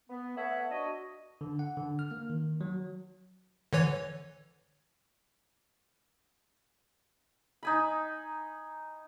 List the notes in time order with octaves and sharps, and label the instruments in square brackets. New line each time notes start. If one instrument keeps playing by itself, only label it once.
[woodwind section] B3
A3 B4 C#5 E5 F#5
D4 F#4 D#5
[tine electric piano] D3
F#5
D3
F6
A#3
D#3
F#3
[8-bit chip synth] D3 E3 C#5
[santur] D#4 G#5 B5